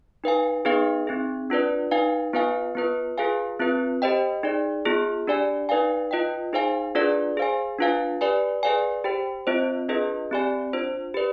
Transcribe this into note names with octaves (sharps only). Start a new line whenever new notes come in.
D#4 B4 F5 G#5
B3 D#4 G#4 B4 F5
C4 D#4 G#4
D4 F4 B4 D5
D#4 B4 F5 G#5
B3 F4 B4 F5 G#5
B3 F4 B4
F4 G#4 B4 F5 G#5
C4 F4 B4
G4 C5 D#5 G5
D#4 G#4 D5
B3 F4 G#4
D4 G4 D5 G#5
D#4 B4 D5 F5 G#5
F4 B4 D#5 G5
D#4 G#4 C5 F5 G#5
D4 F4 G#4 B4 D5
G#4 C5 F5 G#5
D4 F4 B4 F5 G#5
G4 B4 D5 G#5
G#4 B4 D5 F5 G#5
G4 C5 G5
C4 F4 C5 D#5
D4 F4 G#4 B4 D#5
C4 G4 D5 G#5
D4 F4 C5
G4 B4 D5